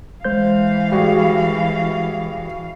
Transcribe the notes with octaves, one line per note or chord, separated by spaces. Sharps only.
E3 G#3 C5 F5 G6
G3 F#4 G#4